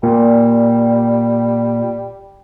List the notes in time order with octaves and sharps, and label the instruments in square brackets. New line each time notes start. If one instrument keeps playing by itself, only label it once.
[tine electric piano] A#2 [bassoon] G3